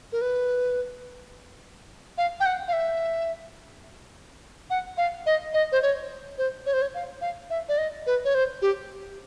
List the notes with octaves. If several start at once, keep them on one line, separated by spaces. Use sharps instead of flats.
A#4
B4
F5
G5
F#5
F5
E5
F#5
F5
D#5
D#5
C5
C#5
C5
C#5
C5
C#5
F5
F5
E5
D5
D#5
B4
C#5
C5
G4